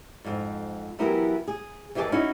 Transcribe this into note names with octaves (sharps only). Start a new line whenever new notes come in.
F2 G#2
E3 F#3 B3 E4 G4 A#4
G#4
F2 E3 A#3 G4 G#4 A5
C#4 D#4 E4 F#4